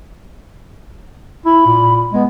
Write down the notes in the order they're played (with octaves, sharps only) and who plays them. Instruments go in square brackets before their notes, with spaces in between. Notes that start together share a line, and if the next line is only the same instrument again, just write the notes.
[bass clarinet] E4 [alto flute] B5
[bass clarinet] A#2
[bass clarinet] G#3 [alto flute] B3